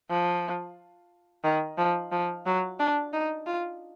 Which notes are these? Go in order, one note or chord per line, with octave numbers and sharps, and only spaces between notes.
F3
D#3
F3
F3
F#3
D4
D#4
F4